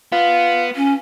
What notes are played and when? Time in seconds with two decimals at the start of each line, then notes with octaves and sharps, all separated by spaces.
0.12 B3 F4
0.76 C#4